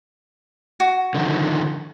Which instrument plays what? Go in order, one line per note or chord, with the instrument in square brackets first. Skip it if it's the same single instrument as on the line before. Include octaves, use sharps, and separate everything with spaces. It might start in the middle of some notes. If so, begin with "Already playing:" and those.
[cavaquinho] F#4
[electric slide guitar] D3 D#3 F3